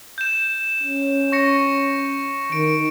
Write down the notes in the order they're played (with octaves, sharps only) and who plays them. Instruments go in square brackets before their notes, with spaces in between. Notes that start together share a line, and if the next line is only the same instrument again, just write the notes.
[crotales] G6 E7
[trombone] C#4
[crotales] C#6 A#6 C#7
[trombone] D#3 [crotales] D7